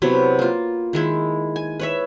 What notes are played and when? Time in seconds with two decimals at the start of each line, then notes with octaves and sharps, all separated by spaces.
0.02 C3 F#3 B3 E4
0.39 A#3 F4
0.93 D#3 G#3 E4
1.56 G#5
1.80 B4 C#5 E5